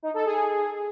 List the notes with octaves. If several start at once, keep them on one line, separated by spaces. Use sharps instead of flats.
D#4
A4
G#4